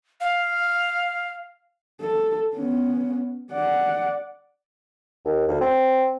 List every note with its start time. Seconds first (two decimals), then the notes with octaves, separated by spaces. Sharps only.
0.21 F5
2.01 A4
2.55 B3 C#4
3.52 D5 F#5
5.25 D#2
5.48 D2
5.61 C4